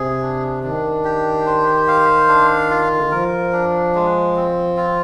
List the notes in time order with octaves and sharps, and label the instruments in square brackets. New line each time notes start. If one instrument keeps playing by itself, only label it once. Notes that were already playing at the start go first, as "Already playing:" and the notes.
Already playing: [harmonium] C3 [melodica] G#4
[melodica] D4
[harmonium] D#3 [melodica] D4
[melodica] G4
C5
F5
D4
F4
[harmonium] D3
D#3
[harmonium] F3 [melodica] A#4
[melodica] D4
G#3
C4
F4